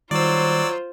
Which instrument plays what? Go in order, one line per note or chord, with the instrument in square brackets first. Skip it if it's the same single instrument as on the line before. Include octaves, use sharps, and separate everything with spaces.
[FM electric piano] D#3 G3 [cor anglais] F#3 [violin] F4 C5 [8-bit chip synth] D5 E6